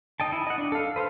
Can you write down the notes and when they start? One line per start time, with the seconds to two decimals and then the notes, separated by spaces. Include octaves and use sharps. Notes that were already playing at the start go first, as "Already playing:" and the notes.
0.20 D#4 D#5 G5 A5
0.32 E4
0.47 D#5 F#5
0.58 D4
0.72 A4 F5
0.96 B4 C5 E5 F5